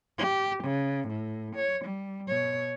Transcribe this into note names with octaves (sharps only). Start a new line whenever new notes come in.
G4
C#3
A2
C#5
G3
B2 C#5